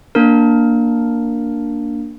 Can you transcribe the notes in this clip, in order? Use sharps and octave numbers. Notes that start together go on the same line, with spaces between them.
A#3 D4 A#4